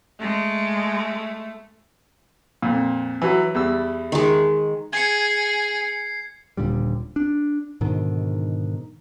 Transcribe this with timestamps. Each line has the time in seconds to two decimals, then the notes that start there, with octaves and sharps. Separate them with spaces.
0.21 G#3 A3
2.62 F2 A#2
3.22 E3 F#3
3.55 E2 G3 E6
4.12 D#3 G#3
4.93 G#4 G#6 C7 C#7
6.57 D#1 A#2 D3 G3
7.16 D4
7.81 G#2 B2 D3 D#3